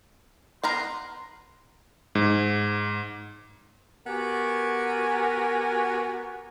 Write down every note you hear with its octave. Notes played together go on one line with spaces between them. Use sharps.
B3 A#4 A#5 C6
G#2
B3 F#4 G4 A#4 G#5